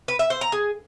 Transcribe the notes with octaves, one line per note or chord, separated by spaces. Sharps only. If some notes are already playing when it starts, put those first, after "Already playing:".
B4
E5
C5
A#5
G#4